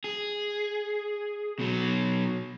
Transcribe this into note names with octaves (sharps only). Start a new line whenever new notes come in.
G#4
B2 F#3